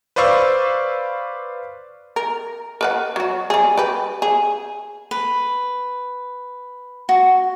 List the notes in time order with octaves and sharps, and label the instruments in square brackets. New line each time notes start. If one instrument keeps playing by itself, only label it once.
[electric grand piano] B4 C5 D5 F5 C#6 E6
[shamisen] A#4
A#4 B4 F#5
F#3 F#4
G3 G#4
G4 B4
G#4
[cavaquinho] B4
F#4